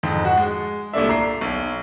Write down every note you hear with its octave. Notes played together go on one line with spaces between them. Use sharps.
F2 G#2
F#4
G#3
C2 A#2 A3 D4 E5
A#5 C7
B1